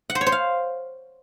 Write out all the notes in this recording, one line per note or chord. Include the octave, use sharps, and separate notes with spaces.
F#5
C5
C#5
C5
F5